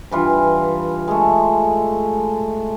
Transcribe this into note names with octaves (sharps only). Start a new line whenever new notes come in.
G2 E3 F4
G#3 A3